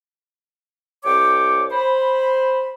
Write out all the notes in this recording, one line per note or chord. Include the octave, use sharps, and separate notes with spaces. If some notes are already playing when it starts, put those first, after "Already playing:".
C2 C#5 G5 D6
C5 B5